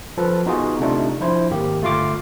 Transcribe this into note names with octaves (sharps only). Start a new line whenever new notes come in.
F3 A4 B4
B3 D#4 F4 F#4 G#4
C3 A3 D4 D#4 F4
F3 D4 E4 C5
G#1 A#3 G4
G1 A3 F4 F5 D6